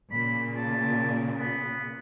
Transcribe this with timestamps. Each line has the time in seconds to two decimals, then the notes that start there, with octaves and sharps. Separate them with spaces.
0.11 A#2 C#3 B5
0.57 A5
1.38 B3